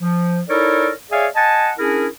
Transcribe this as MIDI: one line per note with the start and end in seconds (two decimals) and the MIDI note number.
0.01 0.41 53
0.49 0.90 63
0.49 0.90 64
0.49 0.90 69
0.49 0.90 70
0.49 0.90 73
0.49 0.90 74
1.11 1.27 68
1.11 1.27 73
1.11 1.27 74
1.11 1.27 76
1.11 1.27 77
1.11 1.27 80
1.36 1.71 75
1.36 1.71 78
1.36 1.71 80
1.36 1.71 81
1.78 2.07 61
1.78 2.07 62
1.78 2.07 64
1.78 2.07 68
1.78 2.07 70